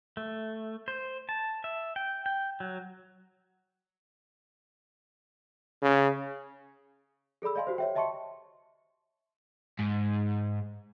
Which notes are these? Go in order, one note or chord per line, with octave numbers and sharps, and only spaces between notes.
A3
C5
A5
E5
G5
G5
F#3
C#3
G#4 A4 D5 B5 E6
D5 D#5 F5 G#5 C6
F#4 G4 C5
C#5 E5 G5
D#5 E5 A5 C6 C#6 C#7
G#2